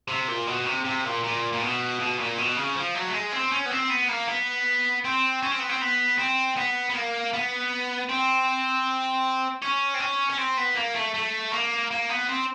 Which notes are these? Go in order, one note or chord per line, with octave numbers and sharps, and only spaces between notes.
C3
A#2
B2
C3
C3
A#2
A#2
A#2
B2
B2
A#2
B2
C#3
F3
F#3
A3
G#3
C4
C#4
B3
C4
B3
A#3
B3
C4
C#4
C4
B3
C4
B3
C4
B3
B3
A#3
B3
C4
C#4
C4
C#4
C#4
C4
B3
A#3
A3
A3
A#3
A#3
B3
C4